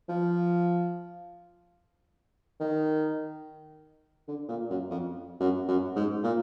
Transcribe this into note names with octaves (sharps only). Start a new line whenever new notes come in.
F3
D#3
D3
A#2
F#2
F2
F#2
F#2
G#2
A#2